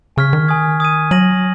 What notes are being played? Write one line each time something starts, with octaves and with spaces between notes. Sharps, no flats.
C#3 G#5 C#6 F6 G#6 B6
D#3
G#5 D#6 G#6
D#6 G#6 D#7
F#3 D#6 A#6 D#7 F#7